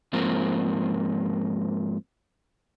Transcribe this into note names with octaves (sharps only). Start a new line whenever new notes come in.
G#2 F3 A#3 C4